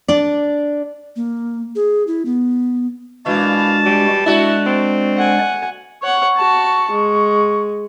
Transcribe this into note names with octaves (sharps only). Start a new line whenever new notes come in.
D4 D5
A#3
G#4
E4
B3
A#2 E3 G#3 D4 F#4 F5 A5
G3
G#3 A3 D4 E4 F#4 D5
C4
F#5 G#5
C#5 F#5 C#6
F#4 A5
G#3